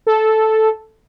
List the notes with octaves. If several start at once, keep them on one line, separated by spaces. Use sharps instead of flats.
A4